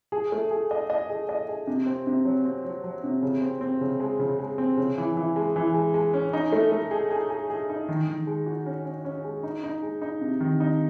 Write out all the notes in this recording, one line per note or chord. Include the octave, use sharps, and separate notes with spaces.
G#4
A3
G#4
D#5
D#5
G#4
D#5
G#4
C3
C4
C3
F#3
C4
F#3
F#3
C3
C#3
C4
C4
C#3
G#3
C#3
G#3
C4
C#3
E3
E3
G#3
E3
G#3
G#3
C#4
D#4
A3
A3
G#4
G#4
G#4
G#4
D#4
D#3
D#3
G#3
F#4
C#4
C#4
C#4
G#3
D#4
D#4
G#3
D#4
C3
D#3
D#4